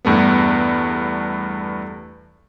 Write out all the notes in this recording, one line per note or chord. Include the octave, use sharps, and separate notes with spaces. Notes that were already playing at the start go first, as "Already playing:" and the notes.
E2 G2 A3 B3